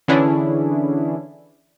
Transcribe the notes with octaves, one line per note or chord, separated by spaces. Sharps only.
D3 E3 C#4 D4 E4 G#4